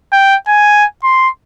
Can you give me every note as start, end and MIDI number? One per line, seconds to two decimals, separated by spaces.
0.12 0.36 79
0.48 0.85 80
1.04 1.29 84